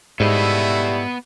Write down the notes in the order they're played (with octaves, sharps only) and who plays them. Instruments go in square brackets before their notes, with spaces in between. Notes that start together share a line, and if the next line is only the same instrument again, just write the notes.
[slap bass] G#2 [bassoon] G3 [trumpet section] A3 E4 [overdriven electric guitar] B3 D#5